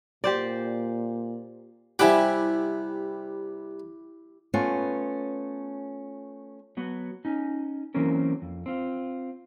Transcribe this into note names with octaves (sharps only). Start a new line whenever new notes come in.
A#2 G4 C5 D5
C3 G3 E4 G4 E5 F#5 G#5 D6
A3 B3 C#4 F4 B4
F#3 B3 F#4
C#4 D#4
E3 F#3 A#3 C4 C#4 A#4
F2
C4 F4